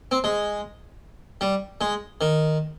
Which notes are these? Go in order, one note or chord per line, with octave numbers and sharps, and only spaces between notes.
C4
G#3
G3
G#3
D#3